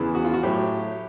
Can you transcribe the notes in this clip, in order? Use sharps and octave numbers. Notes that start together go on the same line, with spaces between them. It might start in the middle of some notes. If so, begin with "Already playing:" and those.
Already playing: E2 C#3 E3
F#4
F4
F#4
A2 F#3 G4